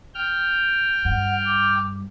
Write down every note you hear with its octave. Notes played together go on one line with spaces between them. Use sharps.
G5 F6
G2 F#5
D6